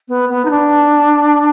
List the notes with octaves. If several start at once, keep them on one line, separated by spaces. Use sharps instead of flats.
B3
B3
D#4
D4